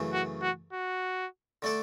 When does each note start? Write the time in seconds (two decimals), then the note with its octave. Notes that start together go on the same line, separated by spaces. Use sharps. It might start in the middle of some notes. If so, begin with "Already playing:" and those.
Already playing: F#2 C#3 E3 A3
0.13 F#4
0.42 F#4
0.73 F#4
1.62 D3 A3 D4 A4 D5